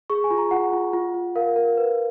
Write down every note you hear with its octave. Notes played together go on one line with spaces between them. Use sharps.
G#4 C#6
G#5
F4
A#5
F4 F#5
F4
F4
F4
A#4 F5
A#4
B4